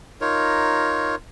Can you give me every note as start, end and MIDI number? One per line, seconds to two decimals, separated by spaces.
0.21 1.15 63
0.21 1.15 65
0.21 1.15 70
0.21 1.15 73